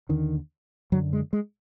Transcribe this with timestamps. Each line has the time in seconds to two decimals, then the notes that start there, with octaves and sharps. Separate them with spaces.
0.09 D#2 D3 D#3
0.92 F#2 D3 F#3
1.13 G#3
1.33 G#3